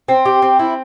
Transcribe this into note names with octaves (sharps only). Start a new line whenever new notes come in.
C4
G4
C4
E4